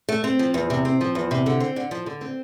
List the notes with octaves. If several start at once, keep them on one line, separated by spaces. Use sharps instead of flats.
A3
C4
F3
E2
C3
C4
F3
E2
C3
D3
C4
D3
F3
D3
C4